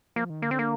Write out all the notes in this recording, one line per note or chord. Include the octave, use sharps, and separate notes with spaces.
F3 A#3
D#3
D3 A#3
C4
A#3